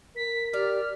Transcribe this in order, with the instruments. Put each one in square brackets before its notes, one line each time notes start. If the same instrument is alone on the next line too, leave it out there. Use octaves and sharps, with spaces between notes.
[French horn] A#4 [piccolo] B6
[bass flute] G4 [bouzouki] D5 [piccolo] F6